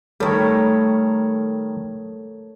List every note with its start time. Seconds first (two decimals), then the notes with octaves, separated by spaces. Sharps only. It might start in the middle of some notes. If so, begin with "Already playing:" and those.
0.20 D#3 G3 A3 E4 A4 A#4 C#5